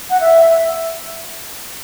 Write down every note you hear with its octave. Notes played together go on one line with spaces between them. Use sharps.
F#5
E5